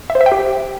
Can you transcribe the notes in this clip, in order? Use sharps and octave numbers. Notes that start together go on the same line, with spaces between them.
E5
C5
E5
G5
G4